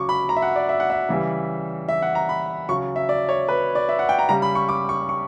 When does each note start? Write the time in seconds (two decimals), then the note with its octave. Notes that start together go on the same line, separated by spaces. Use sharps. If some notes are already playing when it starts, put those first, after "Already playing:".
Already playing: C#3 F#3 C#6 D6
0.09 B5
0.29 A#5
0.36 E5
0.42 F#5
0.56 D5
0.69 E5
0.80 F#5
0.90 E5
1.09 C#3 E3 G3
1.89 E5
2.02 F#5
2.15 A#5
2.29 B5
2.69 C#3 F#3 C#6
2.96 E5
3.09 D5
3.29 C#5
3.49 B4
3.75 D5
3.89 E5
3.99 F#5
4.09 G5
4.19 A#5
4.29 C#3 G3 A#5
4.42 B5
4.55 C#6
4.69 D6
4.89 C#6
5.09 C#6